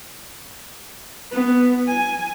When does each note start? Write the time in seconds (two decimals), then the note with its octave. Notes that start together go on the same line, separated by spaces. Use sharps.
1.31 B3
1.88 G#5